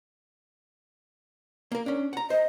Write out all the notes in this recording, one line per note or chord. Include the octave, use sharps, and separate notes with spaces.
A#3 A#4
C#4 D4
F#5 A#5
C5 D#5